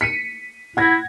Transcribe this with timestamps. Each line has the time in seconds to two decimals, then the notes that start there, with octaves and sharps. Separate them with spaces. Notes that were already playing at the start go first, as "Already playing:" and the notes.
0.01 B6 C#7 D#7
0.77 E4 F#5 G#6 A#6